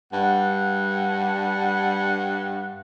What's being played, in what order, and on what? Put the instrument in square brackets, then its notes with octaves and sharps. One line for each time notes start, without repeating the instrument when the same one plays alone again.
[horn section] G2 F#5